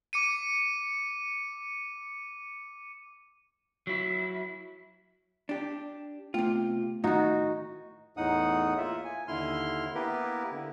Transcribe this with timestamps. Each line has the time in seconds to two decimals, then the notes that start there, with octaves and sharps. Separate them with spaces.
0.13 D6 C#7 D#7
3.87 F#3 E4
5.49 D4 G4
6.34 C3 A3 B3 F4 G5
7.04 A2 D#3 D#4 F#4
8.17 E2 A2 D#4 F#5 D#6
8.77 A#3 F4 E5
9.04 G#5
9.28 D#2 D3 E4 C6 F6
9.95 A#3 B3 E4 G4 A#4 B4
10.51 D3